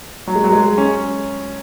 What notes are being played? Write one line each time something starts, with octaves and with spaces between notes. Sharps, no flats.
F#3
G#3
F#3
G#3
C#4